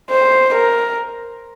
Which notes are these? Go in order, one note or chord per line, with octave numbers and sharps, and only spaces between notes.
C5
A#4